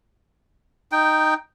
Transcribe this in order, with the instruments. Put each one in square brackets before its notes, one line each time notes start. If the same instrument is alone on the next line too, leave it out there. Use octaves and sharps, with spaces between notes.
[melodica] D#4 G5